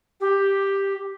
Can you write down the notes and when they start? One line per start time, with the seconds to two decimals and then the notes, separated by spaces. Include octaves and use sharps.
0.20 G4